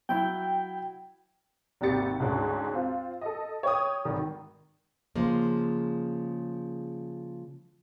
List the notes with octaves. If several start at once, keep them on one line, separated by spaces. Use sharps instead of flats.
F#3 E4 G5
G#1 D#2 C3 G4 A6 C#7
D2 G#2 C#4
C4 F4
A4 D#5
C#5 G5 D#6
G#1 D#3
C#3 F3 G#3 A#3